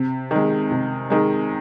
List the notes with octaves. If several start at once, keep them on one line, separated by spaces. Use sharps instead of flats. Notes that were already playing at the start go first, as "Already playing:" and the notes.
Already playing: C3
D#3 G#3
C3
D#3 G#3